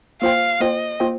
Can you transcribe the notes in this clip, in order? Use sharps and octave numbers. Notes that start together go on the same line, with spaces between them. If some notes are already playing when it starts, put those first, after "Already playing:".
A#3 F4 C5 F5 G5
A#3 F4 C5 D#5 G5
A#3 F4 C5 G5